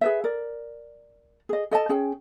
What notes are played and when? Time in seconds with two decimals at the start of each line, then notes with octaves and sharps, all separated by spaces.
0.01 G#4 B4 E5
0.24 A#4 D5
1.49 G#4 D#5
1.71 A4 D#5 E5 A5
1.89 C#4 G#4 G5